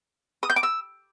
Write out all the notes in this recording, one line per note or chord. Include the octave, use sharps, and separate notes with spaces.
D#6
G6
D6
E6